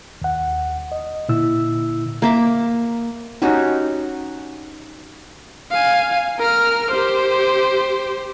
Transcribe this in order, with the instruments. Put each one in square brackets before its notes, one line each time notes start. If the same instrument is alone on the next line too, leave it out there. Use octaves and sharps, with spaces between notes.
[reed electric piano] D#2 F#5
D#5
A#2 D3 E4 E6
[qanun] A#3 E5 D6
C#4 D#4 F#4 G4
[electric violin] F5 G#5
A#4 F6
G4 C5